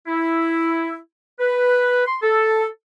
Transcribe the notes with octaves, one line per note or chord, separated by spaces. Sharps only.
E4
B4
C6
A4